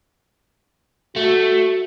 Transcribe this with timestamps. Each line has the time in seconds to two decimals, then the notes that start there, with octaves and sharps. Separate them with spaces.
1.16 A3 F#4